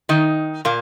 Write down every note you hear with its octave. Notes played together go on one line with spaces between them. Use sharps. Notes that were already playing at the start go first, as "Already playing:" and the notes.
D#3 D#4
A#2 A#3